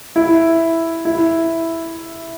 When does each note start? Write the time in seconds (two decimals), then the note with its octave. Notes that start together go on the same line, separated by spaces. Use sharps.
0.16 E4
1.05 E4